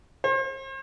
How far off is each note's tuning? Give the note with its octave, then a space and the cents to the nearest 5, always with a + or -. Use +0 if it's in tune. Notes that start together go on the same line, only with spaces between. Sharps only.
C5 +40